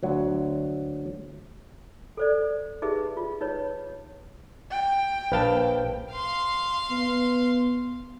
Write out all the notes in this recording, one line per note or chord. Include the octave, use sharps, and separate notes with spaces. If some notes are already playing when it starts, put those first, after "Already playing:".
D2 F#3
A4 C5 D5
D#4 G4 G#4 B4 E5
F4
D#4 B4 C#5
G5
A#1 B4 F5 A5
F5 C6
B3